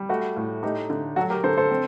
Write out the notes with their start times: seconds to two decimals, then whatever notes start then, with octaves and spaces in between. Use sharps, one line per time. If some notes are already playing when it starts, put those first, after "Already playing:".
Already playing: G3
0.09 A3 F#4
0.36 A2
0.63 A3 D#4 G4
0.90 D3
1.16 F#3 F#4 A4
1.30 G4 A#4
1.44 D3 A4 C5
1.57 A4 C5
1.71 C4